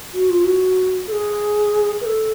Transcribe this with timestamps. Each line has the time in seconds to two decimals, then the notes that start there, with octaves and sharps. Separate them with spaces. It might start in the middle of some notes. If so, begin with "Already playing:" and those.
0.14 F#4
0.30 F4
0.45 F#4
1.07 A4
1.12 G#4
2.01 B4
2.05 A4